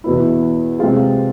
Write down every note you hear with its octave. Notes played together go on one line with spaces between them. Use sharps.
E2 B2 B3 E4
C3 G#3 C4 F4 G#4